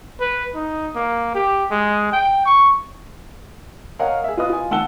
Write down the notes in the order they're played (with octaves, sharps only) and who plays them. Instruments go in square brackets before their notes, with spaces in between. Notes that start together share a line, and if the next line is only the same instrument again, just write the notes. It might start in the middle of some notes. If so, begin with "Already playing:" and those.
[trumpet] B4
D#4
A#3
G4
G#3
G5
C#6
[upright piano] A#4 C#5 D#5 F5 F#5
G#4 E5
F4 B4 D#5 D#6
F4 G#5
D#2 F#5 A5 E6 G7